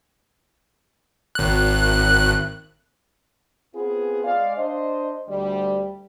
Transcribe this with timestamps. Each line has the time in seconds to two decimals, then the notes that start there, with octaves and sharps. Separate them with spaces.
1.35 G#1 F#6
3.75 B3 C4 F4 G#4
4.24 G#3 D5 F5
4.57 D4 C5 D#5
5.29 D2 G3